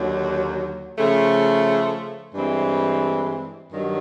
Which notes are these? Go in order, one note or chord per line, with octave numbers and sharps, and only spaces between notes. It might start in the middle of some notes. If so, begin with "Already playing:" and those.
Already playing: D#2 D3 F#3
C#3 F3 A3
G2 E3 G#3 C4
G2 D#3 F#3